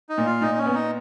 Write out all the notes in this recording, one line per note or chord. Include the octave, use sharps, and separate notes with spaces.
D#4
A#2
F4
A#2 D#4
C#4
B3
D#4